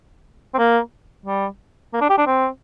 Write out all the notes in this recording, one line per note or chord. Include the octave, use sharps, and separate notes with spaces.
C4
A#3
G3
A#3
D4
G4
D4
C4